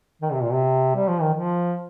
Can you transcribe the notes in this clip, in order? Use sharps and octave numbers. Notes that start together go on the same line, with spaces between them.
D#3
C3
A#2
C3
G3
F3
D#3
F3